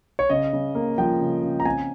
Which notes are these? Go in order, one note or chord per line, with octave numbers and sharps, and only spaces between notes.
C#5
C#3 D#5
C#3
A#3
F3 G5
C#3
C#3
A#5
C4 G#5